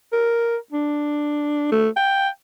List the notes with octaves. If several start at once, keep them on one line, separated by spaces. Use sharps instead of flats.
A#4
D4
A3
G5